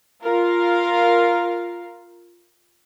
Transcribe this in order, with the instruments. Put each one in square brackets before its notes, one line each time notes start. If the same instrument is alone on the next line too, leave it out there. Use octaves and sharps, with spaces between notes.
[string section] F4 A#4 F5